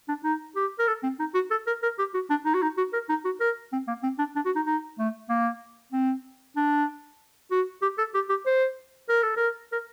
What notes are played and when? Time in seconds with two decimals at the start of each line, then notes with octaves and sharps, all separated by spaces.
0.08 D4
0.24 D#4
0.56 G4
0.79 A#4
0.87 A4
1.03 C4
1.19 D#4
1.34 F#4
1.51 A4
1.67 A#4
1.83 A#4
1.98 G4
2.14 F#4
2.30 D4
2.45 D#4
2.54 F#4
2.62 D#4
2.77 F#4
2.93 A#4
3.09 D#4
3.25 F#4
3.40 A#4
3.72 C4
3.88 A#3
4.03 C4
4.19 D4
4.35 D4
4.45 F#4
4.56 D#4
4.66 D#4
4.99 A3
5.29 A#3
5.92 C4
6.56 D4
7.51 F#4
7.82 G4
7.98 A4
8.14 G4
8.29 G4
8.46 C5
9.09 A#4
9.23 A4
9.37 A#4
9.72 A#4